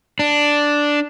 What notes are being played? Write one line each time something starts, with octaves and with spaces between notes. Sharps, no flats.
D4